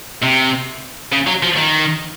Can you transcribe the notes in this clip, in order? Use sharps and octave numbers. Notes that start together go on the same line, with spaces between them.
C3
C#3
F#3
F3
D#3